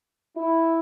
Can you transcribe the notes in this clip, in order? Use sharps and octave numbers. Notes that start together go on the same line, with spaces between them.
E4